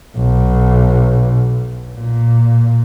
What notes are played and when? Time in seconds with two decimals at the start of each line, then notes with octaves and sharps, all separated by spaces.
0.17 B1
1.93 A#2